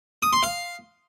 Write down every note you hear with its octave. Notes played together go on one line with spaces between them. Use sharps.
D#6
C6
F5